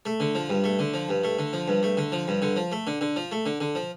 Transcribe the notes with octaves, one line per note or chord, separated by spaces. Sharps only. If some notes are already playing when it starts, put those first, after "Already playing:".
A3
D3
F3
G2
A3
D3
F3
G2
A3
D3
F3
G2
A3
D3
F3
G2
D3
F3
A3
D3
D3
F3
A3
D3
D3
F3